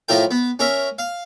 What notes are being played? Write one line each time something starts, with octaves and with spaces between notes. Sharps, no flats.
A2 F3 E4 A#4 G5
B3
C#4 A#4 E5
F5